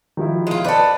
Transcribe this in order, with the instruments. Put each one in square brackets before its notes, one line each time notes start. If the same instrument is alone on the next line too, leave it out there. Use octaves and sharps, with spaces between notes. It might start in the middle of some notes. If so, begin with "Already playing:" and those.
[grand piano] D#3 F3 E4
[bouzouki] G#3 F4
[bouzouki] A4 B4 [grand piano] C5 D5 D#5